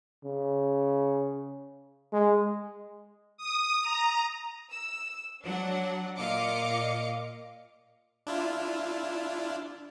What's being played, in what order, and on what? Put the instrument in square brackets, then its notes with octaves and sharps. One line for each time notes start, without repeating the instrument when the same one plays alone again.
[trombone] C#3
G#3
[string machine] D#6
A#5
[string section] E6
F#3 D4 F#5
A#2 D#5 F5 D6 C#7
[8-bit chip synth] D4 E4 F4